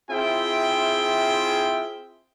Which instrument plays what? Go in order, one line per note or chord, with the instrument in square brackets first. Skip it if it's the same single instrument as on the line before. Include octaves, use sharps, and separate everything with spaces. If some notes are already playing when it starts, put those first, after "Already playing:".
[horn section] C4 E4 F4 G#4 E5 G5